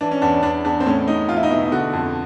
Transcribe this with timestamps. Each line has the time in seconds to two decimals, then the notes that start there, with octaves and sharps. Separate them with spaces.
0.01 E3 D4
0.11 C#4
0.22 E2 D4
0.43 E2 D4
0.65 E2 D4
0.80 C4
0.86 A2 C#4
1.07 A2 D#4
1.29 E2 F4
1.37 E4
1.43 D#4
1.50 B2 E4
1.72 D3 F#4
1.93 F2